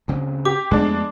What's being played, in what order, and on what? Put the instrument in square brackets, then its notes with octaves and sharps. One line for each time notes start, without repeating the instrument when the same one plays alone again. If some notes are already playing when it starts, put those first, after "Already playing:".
[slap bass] D2 C#3 C4
[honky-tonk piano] G4 [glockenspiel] D6
[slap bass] F2 A3 B3 [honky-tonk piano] G#3 D4